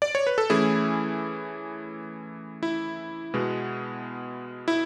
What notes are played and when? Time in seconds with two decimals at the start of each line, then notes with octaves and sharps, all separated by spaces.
0.02 D5
0.15 C#5
0.27 B4
0.38 A4
0.50 E3 A3 C#4 E4 G#4
2.63 E4
3.34 B2 G#3 B3
4.68 E4